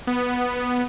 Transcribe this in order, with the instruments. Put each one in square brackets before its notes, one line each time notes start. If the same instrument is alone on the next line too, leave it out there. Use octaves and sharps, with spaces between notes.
[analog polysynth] B3